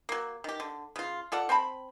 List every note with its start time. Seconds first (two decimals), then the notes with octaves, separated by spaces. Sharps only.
0.09 F#3 A#3
0.44 D#3 G4
0.60 D3
0.96 C#3 F4
1.32 F4 A4 D5 F#5
1.49 C4 G5 A5 B5